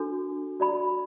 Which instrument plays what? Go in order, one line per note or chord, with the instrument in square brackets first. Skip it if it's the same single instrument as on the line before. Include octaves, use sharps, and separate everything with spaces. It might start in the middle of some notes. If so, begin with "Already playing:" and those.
Already playing: [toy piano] D4 F#4 A4
F#4 D5 B5